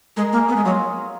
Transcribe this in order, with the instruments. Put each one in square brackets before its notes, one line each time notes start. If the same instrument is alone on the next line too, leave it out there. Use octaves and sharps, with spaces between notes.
[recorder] G#3 [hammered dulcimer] A#4
[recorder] A#3 [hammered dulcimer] G#4
[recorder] B3 [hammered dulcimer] G#4
[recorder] G#3
[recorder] F#3 [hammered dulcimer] F4